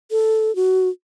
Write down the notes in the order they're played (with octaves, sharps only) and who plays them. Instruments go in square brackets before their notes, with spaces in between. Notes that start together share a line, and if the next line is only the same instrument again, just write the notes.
[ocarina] A4
F#4